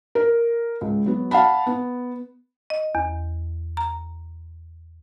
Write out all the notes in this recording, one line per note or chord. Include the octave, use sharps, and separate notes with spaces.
A#4
C#2
F#3 B3
F5 F#5 A5 B5
B3
D#5
E2
A#5